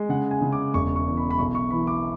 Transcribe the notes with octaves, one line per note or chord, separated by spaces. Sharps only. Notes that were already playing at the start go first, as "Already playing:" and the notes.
Already playing: G#3
C#3 F#5
G#5
C#3
D6
E1 C#6
C#6
E2
B5
B5
B1 C#6
C#6
E3 B5
D6